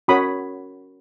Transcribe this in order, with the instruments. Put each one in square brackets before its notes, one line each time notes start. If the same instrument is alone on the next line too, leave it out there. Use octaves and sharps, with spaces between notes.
[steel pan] C#4 F#4 A#4 C#5 B5 D#6